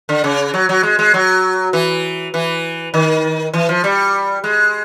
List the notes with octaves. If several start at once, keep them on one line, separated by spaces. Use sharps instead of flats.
D3
C#3
F#3
F#3
G#3
G#3
F#3
E3
E3
D#3
E3
F3
G3
G#3